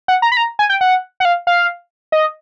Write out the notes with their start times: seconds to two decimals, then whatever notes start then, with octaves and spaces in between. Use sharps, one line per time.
0.08 F#5
0.22 A#5
0.32 B5
0.37 A#5
0.59 G#5
0.70 G5
0.81 F#5
1.20 F#5
1.25 F5
1.47 F5
2.12 D#5